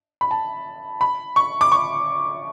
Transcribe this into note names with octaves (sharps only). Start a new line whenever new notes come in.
B5
A5
B5
C#6
D6
C#6